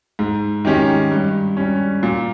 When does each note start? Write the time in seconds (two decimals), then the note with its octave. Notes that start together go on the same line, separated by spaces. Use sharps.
0.19 G#2
0.65 D#3 G#3 C#4 G4
1.12 G2
1.57 G3 C#4
2.03 A#2